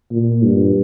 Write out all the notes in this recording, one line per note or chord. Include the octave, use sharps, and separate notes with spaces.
A#2
G2